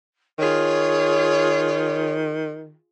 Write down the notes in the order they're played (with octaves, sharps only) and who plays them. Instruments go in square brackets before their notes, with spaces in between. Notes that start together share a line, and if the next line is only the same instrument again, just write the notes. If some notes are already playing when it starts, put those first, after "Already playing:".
[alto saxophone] D#3 [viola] F4 G#4 [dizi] C#5